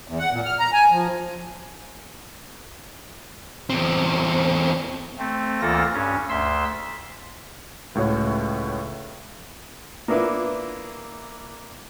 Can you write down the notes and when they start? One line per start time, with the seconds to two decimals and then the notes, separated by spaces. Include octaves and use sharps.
0.08 E2
0.19 F#5
0.32 A#2
0.45 F6
0.59 A#5
0.73 G#5
0.91 F3
3.70 E2 C4
5.19 A3 C4
5.60 D2 E3 A#3 F4 A4 A#6
5.93 G2 C#4
6.29 D2 E5 C6 E6
7.95 C#2 A2 F#4 C#5
10.08 A#3 B3 D4 E4 F4 B4